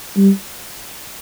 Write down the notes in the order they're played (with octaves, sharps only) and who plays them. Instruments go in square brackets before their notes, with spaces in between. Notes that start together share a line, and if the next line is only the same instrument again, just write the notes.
[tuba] G3